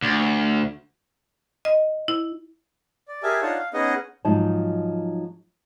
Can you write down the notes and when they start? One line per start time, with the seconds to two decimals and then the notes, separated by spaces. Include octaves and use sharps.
0.02 D2
1.65 D#5
2.08 E4
3.08 D5
3.23 G4 G#4 A#4 E5 G#5 A5
3.42 D4 D#4 F4 C#5 F#5 A5
3.59 F5
3.74 B3 C#4 D#4 G#4 D#5 F#5
4.25 G#2 F3 F#3 D#4 A5